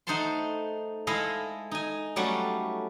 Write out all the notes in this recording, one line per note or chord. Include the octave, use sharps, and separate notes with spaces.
A3 D#4 C5 F#5 A5 C6
G#3 E4 A4 D#5 F5
D#4 G#5
F#3 G3 A3 C#4 F#4